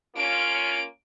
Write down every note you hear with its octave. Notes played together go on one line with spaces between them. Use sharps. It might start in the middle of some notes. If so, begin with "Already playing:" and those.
A#3 C#4 F4 D7